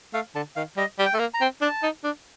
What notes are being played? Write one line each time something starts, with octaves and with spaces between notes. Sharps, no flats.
A3 F5
D3 A5
D#3 F5
G3 D#5
G3
G5
A3
A#3
A#5
C4
D4 A5
D#4
D4